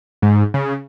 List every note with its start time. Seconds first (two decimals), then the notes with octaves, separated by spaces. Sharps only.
0.22 G#2
0.54 C#3